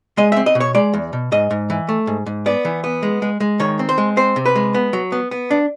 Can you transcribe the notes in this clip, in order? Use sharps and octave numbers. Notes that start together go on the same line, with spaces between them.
G#3 D#5
C4 E5
D#5
B2
C#5
G#3 D5
E2
B2
G#2 D#5
G#2
E3
A3
G#2
G#2
B3 D5
E3
B3
G#3
G#3
G#3
D#3 C#5
C4
C5
G#3
C4 C5
C3
B4
G#3
B3
F#3
B3
B3
D4